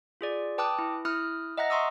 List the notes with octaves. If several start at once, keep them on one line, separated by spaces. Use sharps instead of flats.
F4 G#4 D5
B4 G5 A5 D6 D#6 F#6
E4
E4 D#6 F6 F#6
D#5 E5 F#5 A#5 F#6 A#6
E5 A#5 C6 C#6 D#6 E6